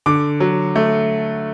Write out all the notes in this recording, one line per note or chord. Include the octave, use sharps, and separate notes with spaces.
D3 D6
F#3
A3